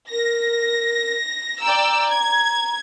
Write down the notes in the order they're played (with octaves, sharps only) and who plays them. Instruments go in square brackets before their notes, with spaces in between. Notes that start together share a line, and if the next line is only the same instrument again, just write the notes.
[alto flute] A#4 [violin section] A#6
[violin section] D5 G5 E6 [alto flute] A#5
[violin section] G#6